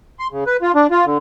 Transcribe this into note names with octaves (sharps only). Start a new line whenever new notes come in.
C6
C#3
B4
F4
D4
F4
D3